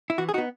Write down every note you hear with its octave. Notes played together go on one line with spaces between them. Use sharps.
E4
E3 F#4
G#4
B3 D#4 F#4